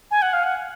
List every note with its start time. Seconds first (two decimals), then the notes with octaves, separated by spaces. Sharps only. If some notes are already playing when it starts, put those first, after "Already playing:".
0.11 G#5
0.22 F#5
0.33 F5
0.44 F#5